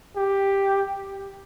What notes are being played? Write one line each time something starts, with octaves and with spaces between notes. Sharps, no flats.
G4